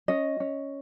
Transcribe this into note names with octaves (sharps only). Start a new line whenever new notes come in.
C#4 D#5
C#4